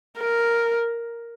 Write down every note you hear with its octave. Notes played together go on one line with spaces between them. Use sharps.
A#4